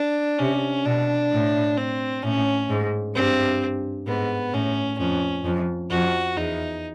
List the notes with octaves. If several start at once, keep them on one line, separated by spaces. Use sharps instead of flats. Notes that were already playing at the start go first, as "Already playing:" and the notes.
Already playing: D4
C3 C#4
B2 D4
A2
C4
A2 C#4
G#2
G2 C4
G#2 B3
A2 C#4
F2 C#4
F2
F2 F#4
E2 D#4